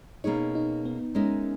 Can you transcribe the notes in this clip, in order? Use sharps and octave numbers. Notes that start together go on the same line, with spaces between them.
B2 A#3 C#4 D#4 G#4 C#5
D#4
B3
G#3 C#4 D#4 A#4 E5